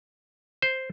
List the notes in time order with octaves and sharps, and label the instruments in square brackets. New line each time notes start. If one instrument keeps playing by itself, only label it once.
[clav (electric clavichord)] C5